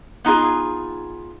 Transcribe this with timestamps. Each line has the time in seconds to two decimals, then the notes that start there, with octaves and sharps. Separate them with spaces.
0.25 B3 D#4 F4 G#4